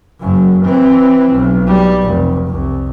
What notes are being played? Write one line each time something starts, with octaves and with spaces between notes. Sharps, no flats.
F#1 F#2
E3 C4
B1
G3
F1
C2